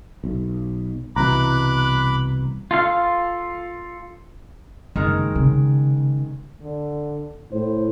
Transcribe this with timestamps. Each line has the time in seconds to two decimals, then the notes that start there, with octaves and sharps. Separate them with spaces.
0.24 B1
1.16 C2 B2 E3 A#5 B5 D6 F#6
2.71 F4 A4 F5
4.96 F#1 D#3 G#3 A#4
5.35 C#3
6.63 D3
7.52 A2 C5